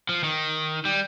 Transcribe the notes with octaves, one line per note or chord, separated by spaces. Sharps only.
F3
D#3
G3